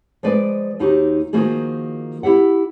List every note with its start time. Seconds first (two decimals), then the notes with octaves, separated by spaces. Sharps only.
0.23 F3 G#3 G#4 B4 D5
0.79 D#2 D#4 F#4 G4
1.33 D#3 F3 A#3 F#4 G#4
2.23 E4 G4 E5 F#5